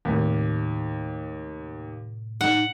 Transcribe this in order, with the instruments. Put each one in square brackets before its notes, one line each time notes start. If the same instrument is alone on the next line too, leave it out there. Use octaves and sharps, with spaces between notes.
[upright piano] D#2 [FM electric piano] A2 C3
[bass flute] D#4 [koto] F#5